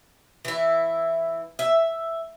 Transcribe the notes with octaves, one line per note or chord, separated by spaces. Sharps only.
E3 E4
E5